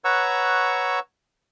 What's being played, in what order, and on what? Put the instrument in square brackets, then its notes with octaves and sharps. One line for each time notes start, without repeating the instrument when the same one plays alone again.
[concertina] B4 C#5 F#5 A#5 C#6 E6